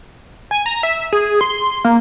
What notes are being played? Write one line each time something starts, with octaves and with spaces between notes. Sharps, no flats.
G#5
A#5
E5
G#4
C6
A#3